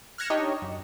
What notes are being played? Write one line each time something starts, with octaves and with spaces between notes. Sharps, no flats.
F6 F#6 G#6 A#6 C#7 E7
D4 D#4 G4 C#5 D#5
F#2